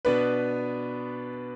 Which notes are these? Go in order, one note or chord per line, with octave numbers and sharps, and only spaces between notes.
B2 B3 D4 B4